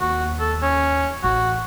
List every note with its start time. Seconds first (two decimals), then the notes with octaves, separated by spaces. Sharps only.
0.01 D#2 F#4
0.40 A4
0.62 C#4
1.24 A1 F#4